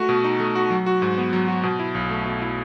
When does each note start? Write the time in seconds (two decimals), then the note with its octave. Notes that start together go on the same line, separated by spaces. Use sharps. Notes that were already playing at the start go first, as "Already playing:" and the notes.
Already playing: A3 F#4
0.09 B2
0.24 D#4
0.40 A3
0.55 F#4
0.71 F#3
0.86 F#4
1.02 G#2
1.18 B3
1.33 F#3
1.48 F#4
1.63 B2
1.79 E4
1.95 B1
2.11 A3
2.25 B2
2.42 E4